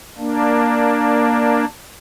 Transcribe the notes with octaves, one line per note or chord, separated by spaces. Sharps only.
A#3 D4